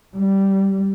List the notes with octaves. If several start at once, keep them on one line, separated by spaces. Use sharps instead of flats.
G3